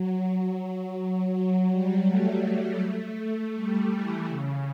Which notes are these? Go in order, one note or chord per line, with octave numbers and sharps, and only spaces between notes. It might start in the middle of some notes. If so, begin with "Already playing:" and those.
Already playing: F#3
F#3
G3
A3
A3
G3
E3
C#3